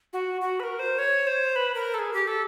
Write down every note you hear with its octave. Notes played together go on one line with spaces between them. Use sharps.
F#4
F#4
B4
A#4
C5
C#5
C5
B4
A#4
A4
G#4
G4
A4